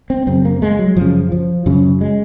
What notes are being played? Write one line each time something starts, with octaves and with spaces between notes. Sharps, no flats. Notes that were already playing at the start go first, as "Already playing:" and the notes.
C4
F#2 C#3 C4
A#3
G#3
F#3
F#2 C#3 F3
F3
F#2 C#3 F#3
G#3